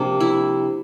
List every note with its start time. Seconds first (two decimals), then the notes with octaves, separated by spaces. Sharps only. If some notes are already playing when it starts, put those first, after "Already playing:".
Already playing: C3 F3 A#3 D4
0.20 E4